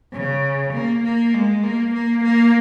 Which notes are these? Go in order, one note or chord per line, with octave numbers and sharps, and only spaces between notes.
C#3
A#3
A#3
G#3
A#3
A#3
A#3